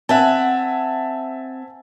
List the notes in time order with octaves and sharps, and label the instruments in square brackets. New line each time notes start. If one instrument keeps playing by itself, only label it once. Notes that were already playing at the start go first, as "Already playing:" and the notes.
[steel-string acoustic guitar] C4 F#5 [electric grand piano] E5 G#5 A5